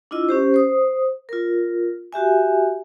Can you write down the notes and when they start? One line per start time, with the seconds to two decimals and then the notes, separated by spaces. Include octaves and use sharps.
0.11 D4 E4 F4 D#5 E6
0.29 C#4 G4 C5
0.54 C5 D#6
1.29 F4 A#4
2.13 F#4 G4 E5 G#5